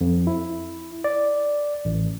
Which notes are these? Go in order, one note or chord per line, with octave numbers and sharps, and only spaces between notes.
F2
E4
D5
A1